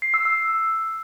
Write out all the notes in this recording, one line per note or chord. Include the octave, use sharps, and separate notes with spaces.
C7
E6
E6